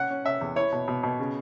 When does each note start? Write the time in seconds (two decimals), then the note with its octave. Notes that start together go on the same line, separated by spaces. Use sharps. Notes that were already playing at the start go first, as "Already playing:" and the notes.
Already playing: C#4 F#5
0.10 C#4
0.25 C#4 E5
0.41 E2
0.56 E4 C#5
0.72 B2
0.88 B2
1.03 B2
1.19 C#3